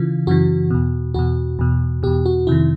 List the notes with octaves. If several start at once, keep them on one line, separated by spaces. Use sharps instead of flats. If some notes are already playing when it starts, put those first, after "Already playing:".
Already playing: C#3 E3 F4
F#2 C#3 E3 F#4
E2 B2
E2 B2 F#4
E2 B2
E2 B2 G4
F#4
F2 C3 D#3 E4